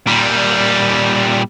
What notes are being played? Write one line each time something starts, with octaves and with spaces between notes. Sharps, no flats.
A#2 G3